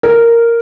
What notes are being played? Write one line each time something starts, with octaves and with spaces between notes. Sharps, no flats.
A#4